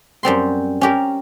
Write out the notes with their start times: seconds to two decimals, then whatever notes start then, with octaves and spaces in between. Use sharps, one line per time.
0.23 F#2 G3 C4 C6
0.81 C#4 G4 A#4